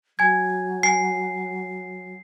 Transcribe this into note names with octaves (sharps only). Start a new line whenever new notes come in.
F#3 G#5 G#6
G#5 C7